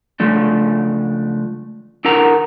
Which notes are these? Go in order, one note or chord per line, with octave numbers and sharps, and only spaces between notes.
C#2 F3 A3 D4
D4 E4 A#4 F#5 A#5